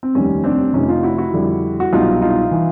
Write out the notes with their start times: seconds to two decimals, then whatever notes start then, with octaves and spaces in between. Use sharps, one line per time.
0.03 C4
0.15 F1 D#2 D#3 G3 C#4
0.44 C4 D4
0.73 F1 F2 C3 C#4 D#4
0.88 D#4 F4
1.03 E4 F#4
1.18 E4 F#4
1.33 F2 D3 G3
1.80 F#4
1.93 C2 B2 F#3 D#4 F4
2.21 D#4 F4
2.51 E3